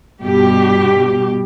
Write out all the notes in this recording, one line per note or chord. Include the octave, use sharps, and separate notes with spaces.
G2 B2 G4